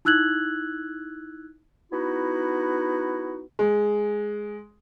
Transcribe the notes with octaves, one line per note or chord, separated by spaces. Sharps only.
D#4 E4 E6 F#6 G#6 F#7
B3 D#4 E4 F#4
G#3